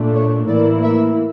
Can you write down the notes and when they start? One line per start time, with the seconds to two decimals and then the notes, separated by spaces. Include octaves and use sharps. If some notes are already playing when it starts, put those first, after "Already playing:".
Already playing: A#2 A3 D4
0.14 C#5
0.48 A2 E3 A#3 E4 D5
0.83 E5